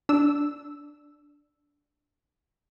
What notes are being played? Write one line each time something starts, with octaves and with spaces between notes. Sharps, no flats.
D4 E6